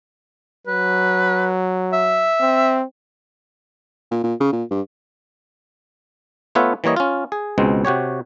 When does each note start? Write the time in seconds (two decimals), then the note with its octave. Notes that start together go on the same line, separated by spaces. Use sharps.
0.67 F#3 B4
1.93 E5
2.40 C4
4.11 A#2
4.23 A#2
4.40 C#3
4.52 A#2
4.71 G2
6.55 A3 B3 F4 B4 C#5 E5
6.84 E3 G3 A#3 C#5 D#5
6.96 C#4 F4
7.32 G#4
7.58 C#2 B2 G#3 C4
7.85 C3 F#4 G4 C#5